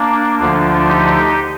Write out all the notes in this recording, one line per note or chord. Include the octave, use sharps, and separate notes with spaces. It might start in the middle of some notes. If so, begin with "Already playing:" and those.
Already playing: A#3 D4
D2 D3 F3 D4 F4
D#4 G4